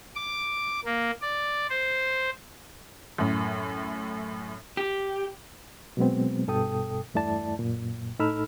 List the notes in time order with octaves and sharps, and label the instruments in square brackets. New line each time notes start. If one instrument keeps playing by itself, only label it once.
[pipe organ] D6
A#3
D5
C5
[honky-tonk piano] F#2 A2
[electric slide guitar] G4
[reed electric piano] B2 F#3 G#3 B3 C4
G2 B2 A4 G5 D#6
E2 G2 A3 E4 D5 A5
F#2 A#2
A2 D#4 A4 B5 E6 F6